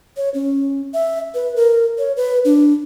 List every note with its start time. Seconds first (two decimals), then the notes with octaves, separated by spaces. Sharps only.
0.17 C#5
0.34 C#4
0.94 E5
1.35 B4
1.56 A#4
1.98 C#5
2.17 B4
2.45 D4